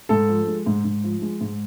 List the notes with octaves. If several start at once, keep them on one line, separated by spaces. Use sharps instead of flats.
G#2 A4
F3
G#3
G#2
G#2
F3
G#3
G#2